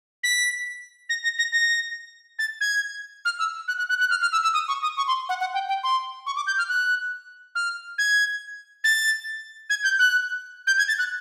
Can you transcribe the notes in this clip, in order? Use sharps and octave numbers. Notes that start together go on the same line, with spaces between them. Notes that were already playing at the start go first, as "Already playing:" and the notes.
B6
A#6
A#6
A#6
A#6
A6
G#6
F6
E6
F#6
F#6
F#6
F#6
F6
F6
E6
E6
D#6
C#6
D#6
C#6
C6
F#5
F#5
G5
G5
C6
C#6
D6
G6
F6
F#6
F6
G#6
A6
G#6
G6
F#6
G6
G#6
A6
F#6